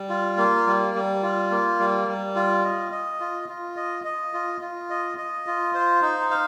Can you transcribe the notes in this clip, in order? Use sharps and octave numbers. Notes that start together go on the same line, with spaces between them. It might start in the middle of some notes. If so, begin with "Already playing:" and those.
Already playing: G3
F4
A#3
G3
G3
F4
A#3
G3
G3
F4
D#5
D#5
F4
F4
D#5
D#5
F4
F4
D#5
D#5
F4
C5
D#4
F5